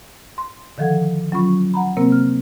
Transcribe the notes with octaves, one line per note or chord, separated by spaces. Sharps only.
C6
D3 D#3 F3 A4 F#5 G#6
F#3 C#4 F4 B5 C#6
F#5 A#5 B5
C3 A#3 C4 A#4
F6